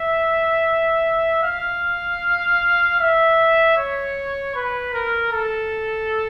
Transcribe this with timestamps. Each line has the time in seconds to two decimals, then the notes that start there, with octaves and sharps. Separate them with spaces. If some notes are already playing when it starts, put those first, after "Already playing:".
Already playing: E5
1.43 F5
3.00 E5
3.77 C#5
4.55 B4
4.94 A#4
5.32 A4